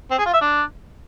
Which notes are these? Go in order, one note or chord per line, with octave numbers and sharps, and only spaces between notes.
C4
G#4
F4
E5
D4